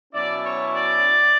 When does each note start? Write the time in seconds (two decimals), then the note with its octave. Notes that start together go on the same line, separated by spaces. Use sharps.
0.13 B2 F#3 C#4 E4 D5
0.42 C#5
0.72 D5